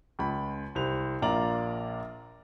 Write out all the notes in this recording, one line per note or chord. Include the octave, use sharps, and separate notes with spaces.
C#2 B5
C2 C5 F7
A#1 A#3 F4 D5 A#5 F#7